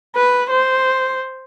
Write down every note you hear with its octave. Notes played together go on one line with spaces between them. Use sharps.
B4
C5